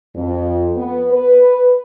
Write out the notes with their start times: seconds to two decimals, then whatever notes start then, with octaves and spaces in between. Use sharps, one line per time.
0.16 F2
0.76 B3
1.11 B4